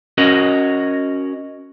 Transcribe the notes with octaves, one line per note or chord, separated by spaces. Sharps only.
C#4 F#4 A#4 D#5